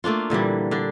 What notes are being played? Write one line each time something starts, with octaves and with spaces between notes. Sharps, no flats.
A3 A#3 D4 F4
A#2 D3 E3 G3
D3 D4